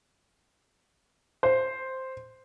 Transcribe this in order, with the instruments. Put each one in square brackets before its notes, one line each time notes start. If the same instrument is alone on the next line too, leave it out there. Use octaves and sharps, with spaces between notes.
[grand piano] C5